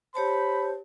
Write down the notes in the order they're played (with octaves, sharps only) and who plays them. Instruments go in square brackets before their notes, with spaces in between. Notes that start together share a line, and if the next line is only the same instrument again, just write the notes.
[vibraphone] G4 C#5 A5 [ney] C5 [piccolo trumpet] B5